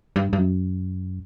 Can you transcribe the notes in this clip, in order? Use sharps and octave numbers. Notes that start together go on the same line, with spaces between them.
G2
G2
F#2